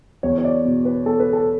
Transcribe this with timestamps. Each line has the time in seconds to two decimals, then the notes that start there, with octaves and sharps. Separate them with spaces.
0.23 E2 C#5
0.38 C#5
0.45 D5
0.65 B2
0.85 B4
1.06 E2 A4
1.20 B4
1.33 A4